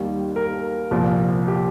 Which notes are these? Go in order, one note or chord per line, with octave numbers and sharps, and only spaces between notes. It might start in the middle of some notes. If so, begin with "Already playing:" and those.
Already playing: D#2 D#3 G3
A#4
C2 A#2 F3
G4